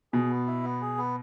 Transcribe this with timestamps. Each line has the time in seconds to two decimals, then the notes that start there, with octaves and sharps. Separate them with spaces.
0.13 B2 G#4
0.30 B3
0.47 E4
0.63 B3
0.81 G#4
0.97 B3